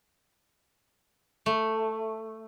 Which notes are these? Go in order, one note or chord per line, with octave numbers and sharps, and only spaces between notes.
A3